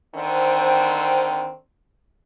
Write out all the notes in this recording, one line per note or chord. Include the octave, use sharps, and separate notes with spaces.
D3 D#3 C4